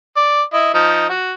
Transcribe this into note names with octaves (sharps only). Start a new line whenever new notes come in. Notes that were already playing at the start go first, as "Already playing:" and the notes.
D5
E4 D#5
F3 D#4
F#4